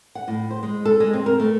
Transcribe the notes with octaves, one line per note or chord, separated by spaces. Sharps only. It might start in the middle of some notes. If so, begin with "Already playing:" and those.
F#5
A2
C5
G#3
A4
G#3
C4
A#4
A3